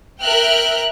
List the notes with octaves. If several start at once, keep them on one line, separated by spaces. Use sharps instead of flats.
A#4 E5 G5 F6 F#6